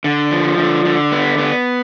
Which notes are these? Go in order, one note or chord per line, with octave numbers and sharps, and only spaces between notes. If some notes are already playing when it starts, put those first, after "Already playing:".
D3
F3
D3
D3
B3
B3